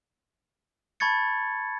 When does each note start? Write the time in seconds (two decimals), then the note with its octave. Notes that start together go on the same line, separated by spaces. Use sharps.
1.00 A5 B5 C#6 G#6 A6 C#7